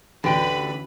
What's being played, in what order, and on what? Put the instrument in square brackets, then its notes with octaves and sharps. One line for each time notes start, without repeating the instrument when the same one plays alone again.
[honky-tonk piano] A1 D2 F#4 [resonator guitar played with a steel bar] D3 G5 [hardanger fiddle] B4 B5